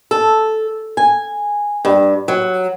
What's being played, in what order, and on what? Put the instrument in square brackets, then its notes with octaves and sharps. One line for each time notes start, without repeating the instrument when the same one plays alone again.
[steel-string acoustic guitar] A4
G#5
G2
F#3